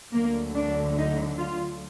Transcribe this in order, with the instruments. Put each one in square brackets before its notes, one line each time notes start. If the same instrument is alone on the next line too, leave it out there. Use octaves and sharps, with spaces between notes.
[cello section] D2 D3 F#3 A#3
D4
D#4
F4